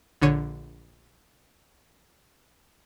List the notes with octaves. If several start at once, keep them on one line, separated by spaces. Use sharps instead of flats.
A#1 D3 C#5 D#7